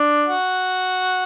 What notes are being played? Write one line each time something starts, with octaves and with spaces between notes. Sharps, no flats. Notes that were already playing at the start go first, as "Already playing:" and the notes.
Already playing: D4
F#4